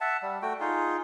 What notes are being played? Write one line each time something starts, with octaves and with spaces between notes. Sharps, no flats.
E5 F#5 A5
G3
A3 F#4 G5
D#4 F4 G#4